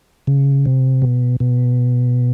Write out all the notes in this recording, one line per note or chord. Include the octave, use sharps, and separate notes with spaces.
C#3
C3
B2
B2